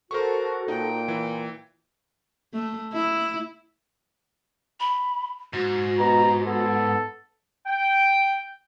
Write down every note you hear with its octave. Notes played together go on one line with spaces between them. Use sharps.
F#4 A4 A#4 C5 C#6
A#2 D#4 G5
E3
A3
E4
B5
G#2 F#4
B2 A#5
B3 A4
G5